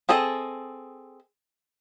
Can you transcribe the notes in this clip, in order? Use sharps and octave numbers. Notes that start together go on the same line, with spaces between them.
C4 G#4 A4 D#5